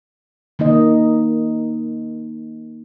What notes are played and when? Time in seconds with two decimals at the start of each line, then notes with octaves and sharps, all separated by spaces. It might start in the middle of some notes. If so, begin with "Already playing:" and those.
0.59 D#3 A#3 D#4 D#5